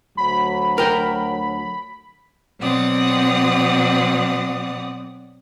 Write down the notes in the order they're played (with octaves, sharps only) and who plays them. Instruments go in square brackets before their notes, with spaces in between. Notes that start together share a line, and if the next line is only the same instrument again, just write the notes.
[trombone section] D2 F#3 [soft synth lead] B5
[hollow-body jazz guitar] A#4 G5
[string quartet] B2 F#3 C4 D5 F#5 D#6